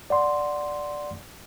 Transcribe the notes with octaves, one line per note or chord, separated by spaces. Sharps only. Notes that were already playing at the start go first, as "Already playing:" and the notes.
D5 F#5 C6